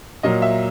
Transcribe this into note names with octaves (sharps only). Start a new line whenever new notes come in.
A#2 F#3 A#3 D#5
E5